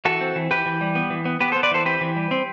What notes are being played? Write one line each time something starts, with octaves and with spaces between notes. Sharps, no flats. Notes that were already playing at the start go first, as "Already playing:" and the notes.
E3 F#4 A4
C4
E3
E3 G4 B4
E3
G3
B3
E3
B3
B3 G4 B4
A4 C5
B3
B4 D5
E3 A4 C5
C4 G4 B4
E3
G3
C4